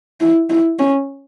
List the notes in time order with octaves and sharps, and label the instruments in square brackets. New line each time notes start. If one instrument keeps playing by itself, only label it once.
[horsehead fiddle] E4
E4
C#4